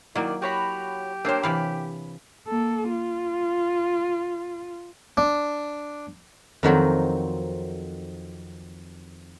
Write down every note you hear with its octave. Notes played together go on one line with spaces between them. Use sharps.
D#3 F#3 A#3 E4 D5 D#5
F#4 G4 C#5 B5
A#3 D4 A#4 C5 C#5 F5 G5
C3 E3 F5 B5
A#3 A4
F4
D4
F2 D#3 F#3 C4